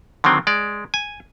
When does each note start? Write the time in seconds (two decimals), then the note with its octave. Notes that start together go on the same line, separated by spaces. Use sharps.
0.24 D3 D#3 F#3 C4
0.47 G#3 D5
0.94 G#5